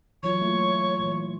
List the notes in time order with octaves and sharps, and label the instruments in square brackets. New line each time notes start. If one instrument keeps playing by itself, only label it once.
[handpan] E3 F#3 F4 [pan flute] C#5 [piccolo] C#6
[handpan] A3 A#3 F4
A#2 E3